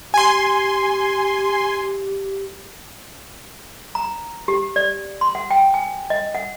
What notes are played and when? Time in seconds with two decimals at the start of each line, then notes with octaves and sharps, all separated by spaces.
0.14 G4 G#5 C6
3.95 A#5
4.48 G4
4.76 D5
5.21 C6
5.35 F#5
5.51 G5
5.74 G#5
6.10 D#5
6.35 F#5